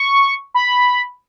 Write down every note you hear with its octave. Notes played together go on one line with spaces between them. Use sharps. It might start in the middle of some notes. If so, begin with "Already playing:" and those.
Already playing: C#6
B5